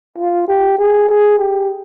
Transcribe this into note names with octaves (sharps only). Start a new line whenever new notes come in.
F4
G4
G#4
G#4
G4